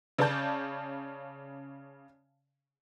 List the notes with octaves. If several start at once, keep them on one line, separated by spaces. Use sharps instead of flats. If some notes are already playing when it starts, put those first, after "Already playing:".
C#3 C#4 C#5 D5 A5 G6